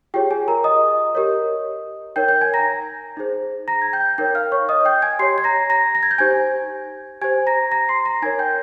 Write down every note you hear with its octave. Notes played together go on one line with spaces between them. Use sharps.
F4 G4 G#4 C#5 G5
G#4 G#5
A#4 A#5
D#5 D#6
G4 A#4 C#5
D#4 A#4 C#5 G5 G6
G5 G6
G#5 G#6
A#5 A#6
D#4 G#4 C5
A#5 A#6
G#6
G5 G6
D#4 A#4 C#5 G5 G6
F5 F6
C#5 C#6
D#5 D#6
G5 G6
G#5 G#6
G4 C#5 C6 C7
G#6
A#5 A#6
A#5 A#6
A#6
G#6
G6
D#4 G4 C5 G#5 G#6
G4 C5 G#5 G#6
A#5 A#6
A#5 A#6
C6 C7
A#5 A#6
D#4 A#4 C#5 G#5 G#6
G5 G6